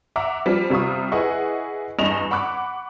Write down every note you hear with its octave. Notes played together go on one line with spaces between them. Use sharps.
E5 F#5 A#5 D6
F3 G3
C3 G3 F4 C#6 D#6
E4 G#4 B4 D#5 F#5 C#6
E2 G2 D#5 E7 F7
F#5 B5 C#6 D6 F#6